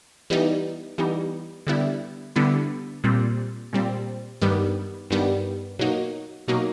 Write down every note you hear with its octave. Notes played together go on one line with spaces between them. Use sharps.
E3 G3 B3 D#4
E3 G3 B3 D#4
D3 G3 B3 E4
D3 G3 B3 E4
A#2 G3 C4
A#2 G3 C4
G2 D#3 G3 B3
G2 D#3 G3 B3
B2 F#3 A#3 D#4 F#4
B2 F#3 A#3 D#4 F#4